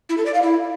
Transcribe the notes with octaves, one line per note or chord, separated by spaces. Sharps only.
E4
A4
D5
F5
E4